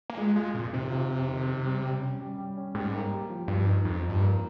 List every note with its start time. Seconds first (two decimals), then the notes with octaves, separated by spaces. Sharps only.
0.10 A#3
0.18 G#3 F4
0.36 G#3 F4
0.54 F2 A#2
0.73 C3 D#3
0.91 F4
1.09 F2
1.28 D#3
1.46 F2
1.65 G3
1.83 G3
2.01 C#4
2.20 G3
2.38 G3
2.57 C#4
2.75 G#2 G3
2.93 A#3
3.11 G4
3.30 F3
3.48 G2 F3
3.66 D#4
3.84 F2 D#4
4.03 F3
4.10 G2
4.21 A#3